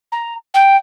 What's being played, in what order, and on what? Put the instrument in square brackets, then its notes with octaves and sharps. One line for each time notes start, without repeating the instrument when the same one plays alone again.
[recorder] A#5
G5